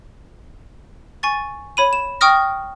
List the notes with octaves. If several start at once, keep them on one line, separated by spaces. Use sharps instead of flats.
G#5 C#6 A6
C#5 B5 D#7
E7
G5 C#6 D#6 F6 A#6